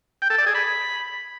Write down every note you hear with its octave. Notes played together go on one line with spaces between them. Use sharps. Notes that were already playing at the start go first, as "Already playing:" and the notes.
G5
A4
D5
G#4
B5